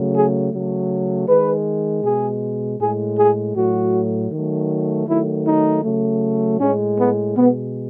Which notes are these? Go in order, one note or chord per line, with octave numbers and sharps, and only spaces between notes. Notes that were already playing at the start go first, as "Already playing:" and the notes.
Already playing: C#3 F#3 A3
G#4
C#3 F#3 A3
D#3 G#3 B4
B2 G#3 G#4
A2 G#3 G#4
G#4
A2 F#3 A3 F#4
D#3 F#3 A3
D#3 F#3 A3 E4
D#4
C#3 F#3 A3
A2 G#3 C#4
B3
B2 G#3 B3